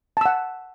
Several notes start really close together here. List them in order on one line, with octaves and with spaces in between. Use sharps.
A5 E6 F#5